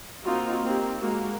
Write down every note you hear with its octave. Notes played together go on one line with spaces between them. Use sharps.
A#3 C4 D#4 F4 F#4
A#3 C4 D#4 G4
G#3 A#3 F#4